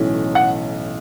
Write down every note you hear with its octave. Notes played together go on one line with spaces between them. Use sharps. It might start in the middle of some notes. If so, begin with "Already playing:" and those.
Already playing: B1 A2 E3 C#4
F#5